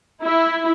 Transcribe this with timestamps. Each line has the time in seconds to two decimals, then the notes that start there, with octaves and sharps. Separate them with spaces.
0.23 E4